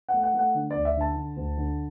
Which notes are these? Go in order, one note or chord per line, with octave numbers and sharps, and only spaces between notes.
F#5
A3
F#5
A3
F#5
D3
D2 D5
E5
D3 A5
D3
D2
D3